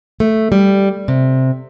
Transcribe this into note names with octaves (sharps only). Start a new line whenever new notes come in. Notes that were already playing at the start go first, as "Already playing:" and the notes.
A3
G3
C3